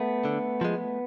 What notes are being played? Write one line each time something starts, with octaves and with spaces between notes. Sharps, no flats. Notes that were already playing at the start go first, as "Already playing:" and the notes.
Already playing: A3 B3
D3
F3 G#3